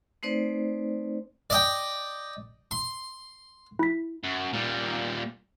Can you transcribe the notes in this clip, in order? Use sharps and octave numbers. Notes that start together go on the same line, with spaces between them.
A3 C4 D#4 B4 C5 D5
D5 D#5 G5
C6
E4 B6
F#2
A#2 G3